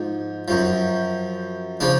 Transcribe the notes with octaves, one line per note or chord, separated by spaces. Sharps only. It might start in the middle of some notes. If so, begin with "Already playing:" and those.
Already playing: G#2 F3
F#2 F3
C#3 F3 D4